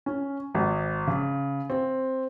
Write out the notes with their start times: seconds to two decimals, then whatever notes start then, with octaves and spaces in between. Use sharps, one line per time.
0.06 C#4
0.55 G#1
1.07 C#3
1.70 C4